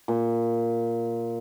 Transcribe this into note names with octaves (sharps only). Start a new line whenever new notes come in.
A#2